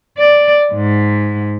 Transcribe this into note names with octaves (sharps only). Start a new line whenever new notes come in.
D5
G#2